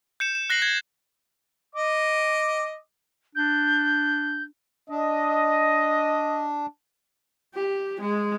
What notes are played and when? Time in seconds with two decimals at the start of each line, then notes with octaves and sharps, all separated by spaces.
0.20 G6 C#7 E7
0.35 E7
0.50 F#6 A#6 C7 F#7
0.62 G#6
1.75 D#5 D6
3.35 D4 G6
4.90 D4 D#5
7.54 G4
8.01 G#3